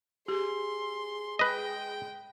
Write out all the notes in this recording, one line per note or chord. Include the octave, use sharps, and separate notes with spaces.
G4 G#4 C6
G#3 B4 D#5 G5